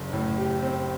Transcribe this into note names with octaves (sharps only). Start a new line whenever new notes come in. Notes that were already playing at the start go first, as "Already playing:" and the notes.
Already playing: F#1
A2
G4
C4